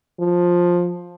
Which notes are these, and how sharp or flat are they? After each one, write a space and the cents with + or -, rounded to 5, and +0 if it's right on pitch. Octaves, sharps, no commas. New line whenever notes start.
F3 +10